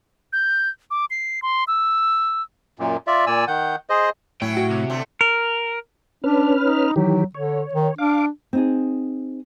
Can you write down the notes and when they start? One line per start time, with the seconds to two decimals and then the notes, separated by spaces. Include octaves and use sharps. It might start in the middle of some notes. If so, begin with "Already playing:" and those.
0.33 G6
0.91 D6
1.10 C7
1.42 C6
1.68 E6
2.79 F#2 A#2
3.07 F4 D5 E5
3.27 A#2 D5 G#5 E6
3.48 D#3 F#5 G6
3.90 G#4 C5 D#5
4.42 A2 F#3 C#4 E4 G5
4.57 F#4
4.70 C3
4.90 D3 A3 C4
5.21 A#4
6.24 C#4 D4 B4 F6
6.63 D#4
6.96 D#3 E3 F#3 G4
7.35 D3 C#5
7.73 D#3
7.98 D4 F5 D6
8.53 C4 D#4 G#4